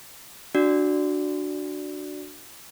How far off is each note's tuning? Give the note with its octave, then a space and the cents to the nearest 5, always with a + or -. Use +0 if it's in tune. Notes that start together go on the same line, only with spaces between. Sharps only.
D4 +10 F#4 +0 D5 +0